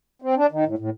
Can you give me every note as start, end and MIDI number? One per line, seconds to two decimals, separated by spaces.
0.22 0.35 60
0.37 0.46 62
0.51 0.65 51
0.66 0.75 45
0.78 0.90 45